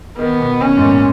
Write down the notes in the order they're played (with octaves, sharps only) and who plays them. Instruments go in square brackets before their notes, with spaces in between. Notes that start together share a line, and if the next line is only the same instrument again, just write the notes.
[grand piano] D#3 [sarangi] B3
[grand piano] B2
[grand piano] B2 [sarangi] C#4
[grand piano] G#2
A#2